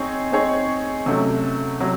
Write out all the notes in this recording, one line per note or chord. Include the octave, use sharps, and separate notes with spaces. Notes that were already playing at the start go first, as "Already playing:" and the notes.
Already playing: C4 D#4 G#4 C#5
C4 D#4 G#4 C#5
C3 F#3 A3 C#4
C3 F#3